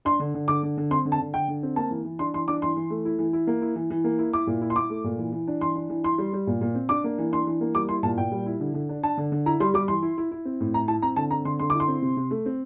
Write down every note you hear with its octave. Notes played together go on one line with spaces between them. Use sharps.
D4 C6
D3
D3
D3 D6
D3
D3
C4 C6
D3
A5
D3
D3 G5
D3
C4
A#3 A5
E3
E3
D4 C6
E3 C6
D4 D6
E3 C6
E3
A3
E4
E3
E4
A#3
E4
E3
E3
A#3
E4
E4 D6
A#2
E4
C6
E4 D6
A3
A#2
E3
E3
D4
E3 C6
D4
E3
E4 C6
G3
G3
A#2
A#2
C4
D4 D6
A#3
E3
D4 C6
E3
A#3
G3 D6
E4 C6
A#2 A5
A#2 G5
G3
E4
D3
D3
D4
D4 A5
D3
D3
E4 A#5
G3 C6
G3 D6
E3 C6
E4
E4
E4
C4
A2
E4 A#5
E4 A5
C4 A#5
D3 A5
C4 A#5
D3 C6
D3 C6
E4 D6
C6
C4
C3
C3
A3
C4